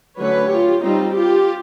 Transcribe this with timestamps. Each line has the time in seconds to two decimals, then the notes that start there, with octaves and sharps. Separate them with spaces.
0.19 D3 F#3 A3 C#4 B4 C#5
0.51 F4 G4
0.83 G3 C4 D#4 F4
1.15 F4 G4